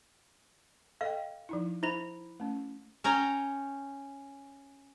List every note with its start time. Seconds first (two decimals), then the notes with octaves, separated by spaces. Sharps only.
1.01 A4 D#5 F5 G5
1.49 F3 D#4 E4
1.83 E4 C5 B5
2.40 A3 C#4
3.04 C#4 C#5 G5 G#5 A#5